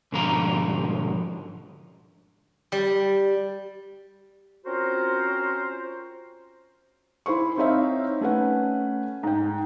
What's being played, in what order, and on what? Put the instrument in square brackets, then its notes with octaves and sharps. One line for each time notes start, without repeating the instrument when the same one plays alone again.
[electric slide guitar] G#2 B2 D3 F3 A#5
[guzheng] G3
[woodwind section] C4 C#4 F4 F#4 A#4 C5
[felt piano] E4 C5 C6 C#6
C4 D#4 C5 C#5 E5 F5
A3 C#4 B4 F#5
G#2 G5